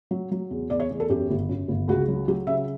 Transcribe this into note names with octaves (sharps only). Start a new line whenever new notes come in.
F#3
F#3
E2
E2 D5
C#5
E2
A4
F#2 G4
G1
F#2
G1
C#2 F#4
F#3
F#3 G4
C#3 E5